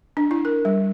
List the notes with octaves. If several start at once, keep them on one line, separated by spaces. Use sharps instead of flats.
D4
E4
A#4
G3